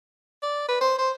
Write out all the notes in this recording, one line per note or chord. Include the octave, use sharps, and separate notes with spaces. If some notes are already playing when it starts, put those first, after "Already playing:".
D5
B4
C5
C5